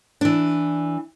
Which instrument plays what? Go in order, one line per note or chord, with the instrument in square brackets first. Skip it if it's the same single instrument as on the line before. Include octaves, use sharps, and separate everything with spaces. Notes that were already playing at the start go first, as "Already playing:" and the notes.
[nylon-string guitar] E3 D4